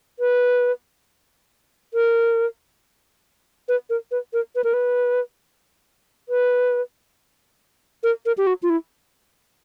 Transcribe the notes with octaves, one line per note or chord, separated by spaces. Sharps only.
B4
A#4
B4
A#4
B4
A#4
B4
A#4
B4
B4
A#4
A#4
G4
F#4
F4
E4